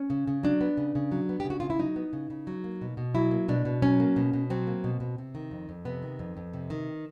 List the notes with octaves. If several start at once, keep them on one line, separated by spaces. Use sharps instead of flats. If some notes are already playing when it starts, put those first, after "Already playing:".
Already playing: C#4
C#3
C#3
F#3 D4
B3
C#3
C#3
F#3
B3
G4
C#3
F#4
C#3 F4
E4
F#3 D#4
B3
C#3
C#3
F#3
A#3
B2
B2
F#3 E4
A#3
B2 D4
B2
F#3 C#4
A#3
B2
B2
F#3 C4
A#3
B2
B2
C3
D#3
F2
F2
C3 B3
D#3
F2
F2
C3
D#3